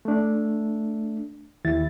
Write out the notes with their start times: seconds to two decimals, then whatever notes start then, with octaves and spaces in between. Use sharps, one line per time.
0.05 A3 D4
1.65 D#2 D#3 E4 A6